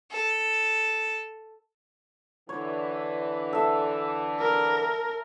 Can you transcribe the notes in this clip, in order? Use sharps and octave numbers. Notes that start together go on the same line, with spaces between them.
A4
D3 E3 C#5
A4 E5
A#4